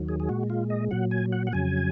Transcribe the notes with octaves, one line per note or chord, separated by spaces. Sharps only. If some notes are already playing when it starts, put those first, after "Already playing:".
Already playing: D#2 D#3 F#3
G#4
G#4
A#2 G#3 F#4
F4
D#5
A#2 F#3 F#5
G#5
F#5
F#5
F2 C#3 F#3 G#5